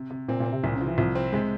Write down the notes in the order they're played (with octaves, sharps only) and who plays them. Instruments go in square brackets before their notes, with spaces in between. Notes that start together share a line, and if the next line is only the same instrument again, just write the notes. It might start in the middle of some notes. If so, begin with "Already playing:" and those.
Already playing: [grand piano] C3
C3
[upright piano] A#2 [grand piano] C4
[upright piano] A#2
[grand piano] C4
[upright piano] C3
[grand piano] C2 [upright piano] A#2
[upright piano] C#3
[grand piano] F3
[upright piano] E3
[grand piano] C2 [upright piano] F3
[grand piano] C4
[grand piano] C3 [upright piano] G#3